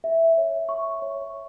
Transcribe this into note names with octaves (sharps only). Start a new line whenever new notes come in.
E5
C#5
C#6
C#5